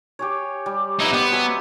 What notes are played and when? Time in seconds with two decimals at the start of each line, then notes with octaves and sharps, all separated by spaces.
0.19 G4 G#4 C#5
0.66 G3
0.99 B3 D#4 E4 D#5
1.13 B3 G4 C5
1.32 F#3 G#4 E5